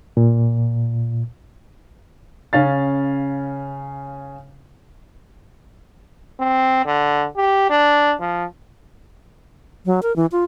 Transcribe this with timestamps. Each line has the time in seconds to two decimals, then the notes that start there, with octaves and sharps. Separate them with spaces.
0.17 A#2
2.53 C#3 C#4 F5 A6
6.40 C4
6.86 D3
7.37 G4
7.70 D4
8.20 F3
9.86 F#3
10.03 A#4
10.16 E3
10.32 F4